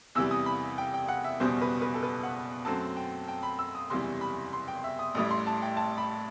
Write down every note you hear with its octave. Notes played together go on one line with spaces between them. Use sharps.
E2 C3 E3 G3 E6
D#6
B5
G5
G5
F#5
E5
F#1 E2 B2 G3 C5
B4
B4
A4
B4
F#5
F#2 F#3 A3 C4 A5
G5
G5
B5
E6
D#6
F#1 E2 C3 E3 G3 C6
B5
C6
G5
E5
D#6
A1 A2 G3 D#6
C6
A5
G5
A5
B5